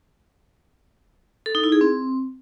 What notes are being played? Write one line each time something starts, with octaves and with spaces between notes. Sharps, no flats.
A4
D#4
E4
G#4
C4